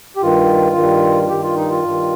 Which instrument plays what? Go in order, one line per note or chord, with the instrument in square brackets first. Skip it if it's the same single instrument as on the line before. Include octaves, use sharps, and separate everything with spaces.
[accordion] G4
G2 D#3 F4
G2 D#3
G2 D#3 G4
F4
D#4
F4
G2 D#3